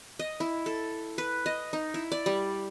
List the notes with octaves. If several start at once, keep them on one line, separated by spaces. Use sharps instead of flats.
D#5
E4
A4
B4
D#5
D#4
E4
D5
G3